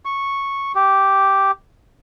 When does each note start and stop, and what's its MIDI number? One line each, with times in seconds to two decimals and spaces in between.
0.05 0.72 85
0.75 1.51 67